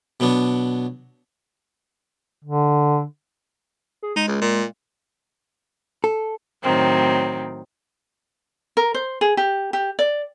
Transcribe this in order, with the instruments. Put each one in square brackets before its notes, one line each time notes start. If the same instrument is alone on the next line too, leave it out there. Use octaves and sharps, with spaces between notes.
[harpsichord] B2 F#3 B3 D4
[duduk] D3
[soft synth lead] G#4
[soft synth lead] G#3 [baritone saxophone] D#4
[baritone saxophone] C#2
A#2
[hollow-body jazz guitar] A4
[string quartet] A2 D#3 F#3 C4
[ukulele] A#4
C5
G#4
G4
G4
D5